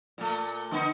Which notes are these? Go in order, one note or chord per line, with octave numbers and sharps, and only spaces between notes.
A#2 A3
D3 B3 D#4